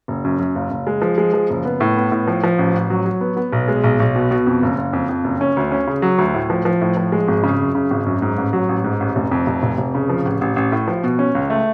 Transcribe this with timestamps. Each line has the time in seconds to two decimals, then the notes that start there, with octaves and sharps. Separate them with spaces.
0.08 F#1
0.25 F#2
0.39 F#2
0.55 F#1
0.71 F#1
0.87 G#3
1.02 F3
1.18 G#3
1.33 F3
1.50 F#1
1.65 B3
1.80 A2
1.97 B3
2.12 A2
2.28 F3
2.44 F3
2.58 A1
2.74 A1
2.90 F#3
3.05 F#3
3.21 B3
3.37 B3
3.53 B1
3.68 G#3
3.84 B1
4.00 B1
4.16 B2
4.31 B2
4.47 F2
4.63 F#1
4.78 F#1
4.93 F2
5.09 F2
5.24 F#1
5.41 C#4
5.57 D2
5.72 C#4
5.87 C#3
6.02 F#3
6.18 D2
6.34 A2
6.50 F3
6.65 F3
6.81 A2
6.97 F3
7.12 G#3
7.28 G#1
7.43 C#3
7.60 F#2
7.75 C#3
7.91 G#1
8.06 F#2
8.22 G#2
8.38 A1
8.53 F#3
8.69 A1
8.84 G#2
9.00 A1
9.16 F1
9.31 F2
9.47 F1
9.63 F1
9.78 F1
9.95 C#3
10.09 F3
10.25 A1
10.41 A1
10.56 A1
10.72 A2
10.88 F3
11.04 B2
11.19 C#4
11.35 C#2
11.50 A3